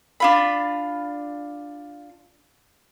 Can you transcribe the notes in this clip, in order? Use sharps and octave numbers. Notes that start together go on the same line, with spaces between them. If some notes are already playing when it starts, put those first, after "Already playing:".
D4 F4 B5